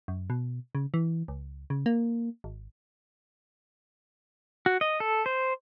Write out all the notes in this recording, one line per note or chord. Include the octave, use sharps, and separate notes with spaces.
F#2
B2
C#3
E3
C#2
C#3
A#3
G#1
F#4
D#5
A4
C5